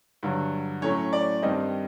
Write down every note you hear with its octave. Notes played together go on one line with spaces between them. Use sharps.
G2 D3 F#3
A2 F#3 A3 C#4 C#5
D5
G2 D#3 G3 C4 D#5